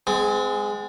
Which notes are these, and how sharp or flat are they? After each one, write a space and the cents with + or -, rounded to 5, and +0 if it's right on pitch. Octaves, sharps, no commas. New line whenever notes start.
G#3 +0 C4 -40